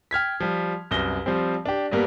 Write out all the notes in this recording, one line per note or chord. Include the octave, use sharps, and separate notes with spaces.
G5 F6 G#6 B6
F3 G3
C2 F#2 B4 A#6 G7
F3 G3 C4
D4 G4
G2 G3 A#3 B3